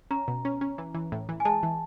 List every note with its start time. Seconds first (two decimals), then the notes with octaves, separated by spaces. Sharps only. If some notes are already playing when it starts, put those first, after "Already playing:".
0.11 C#4 A#5
0.28 B2
0.45 C#4
0.61 C#4
0.78 E3
0.94 E3
1.12 A2
1.29 E3
1.40 G#5
1.45 G#3 A5
1.63 E3